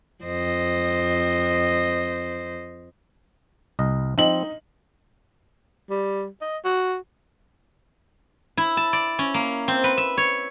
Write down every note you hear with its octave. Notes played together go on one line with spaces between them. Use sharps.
F2 C5 D#5
C2 D#5
F3 C4 D#4 F#7
G3
D#5
F#4
E4
A5
D5
C#4
A#3
C4
B4
E5
C#5